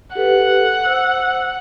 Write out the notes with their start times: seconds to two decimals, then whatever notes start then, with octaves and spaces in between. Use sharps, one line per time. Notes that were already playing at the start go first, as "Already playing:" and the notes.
0.15 G4 A4 B4 F#5
0.84 C5 E6